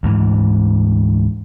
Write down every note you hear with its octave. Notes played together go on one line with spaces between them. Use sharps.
D2 G#2 E3